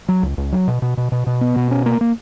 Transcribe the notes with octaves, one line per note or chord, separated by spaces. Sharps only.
F#3
C#2
C#2
F#3
B2
B2
B2
B2
B2
B3
B2
C#4
A#3
A#3